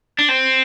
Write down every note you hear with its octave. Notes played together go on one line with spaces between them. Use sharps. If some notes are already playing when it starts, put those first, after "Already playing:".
D4
C4